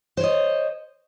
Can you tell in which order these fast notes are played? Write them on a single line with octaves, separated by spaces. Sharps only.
C5 C#5 D#5